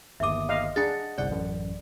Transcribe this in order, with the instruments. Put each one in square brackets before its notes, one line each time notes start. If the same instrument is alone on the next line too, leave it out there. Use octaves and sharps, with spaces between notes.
[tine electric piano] G1 D#2 D#6 [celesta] E5 D6
[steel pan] D#5 F5
[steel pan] D4 G#4 [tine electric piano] D#5 F#5 C#7 [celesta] A6
[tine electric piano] G1 C2 F#5 [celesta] D5
[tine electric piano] A1 F#2